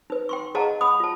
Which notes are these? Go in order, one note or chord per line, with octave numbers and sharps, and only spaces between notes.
D#4 B4
G5 C6 C#6
G#4 D#5 F5 F#5 A5 A#5
F#5 B5 D#6
F4 A5